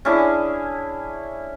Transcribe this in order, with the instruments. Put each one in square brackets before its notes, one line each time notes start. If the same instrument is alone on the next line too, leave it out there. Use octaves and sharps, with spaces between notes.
[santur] C#4 D4 E4 G#4